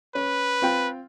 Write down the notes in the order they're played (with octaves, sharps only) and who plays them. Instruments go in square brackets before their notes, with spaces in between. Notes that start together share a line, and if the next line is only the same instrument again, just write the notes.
[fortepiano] C#4 [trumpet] B4
[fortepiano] C4 F4 G5